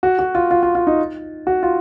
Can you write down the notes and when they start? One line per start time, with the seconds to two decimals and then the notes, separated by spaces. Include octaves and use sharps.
0.03 F#4
0.19 F#4
0.35 F4
0.51 F4
0.63 F4
0.75 F4
0.87 D#4
1.47 F#4
1.63 F4